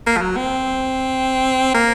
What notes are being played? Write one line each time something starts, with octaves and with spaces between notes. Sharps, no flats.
A#3
F3
F#3
C4
A#3